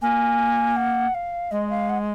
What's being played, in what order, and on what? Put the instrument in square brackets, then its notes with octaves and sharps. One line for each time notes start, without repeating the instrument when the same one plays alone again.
[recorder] A#3 [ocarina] G#5
[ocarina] F#5
F5
[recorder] G#3 [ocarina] D#5
[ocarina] F5
F#5